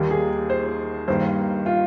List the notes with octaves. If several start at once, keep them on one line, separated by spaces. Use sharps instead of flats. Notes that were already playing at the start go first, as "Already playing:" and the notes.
Already playing: D#2 D#3 G3 A#3
G#4
C5
G2 D#3 A#3 C5
F4